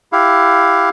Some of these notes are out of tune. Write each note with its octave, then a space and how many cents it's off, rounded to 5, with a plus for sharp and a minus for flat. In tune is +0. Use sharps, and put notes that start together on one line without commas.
E4 +15 G4 +0 F5 +15